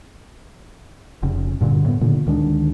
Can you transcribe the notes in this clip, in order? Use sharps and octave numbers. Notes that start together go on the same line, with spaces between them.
F1 C#3
G2 A#2 D3
A2 B3
A#2 D3 D#3
D2 D#3 G#3 D4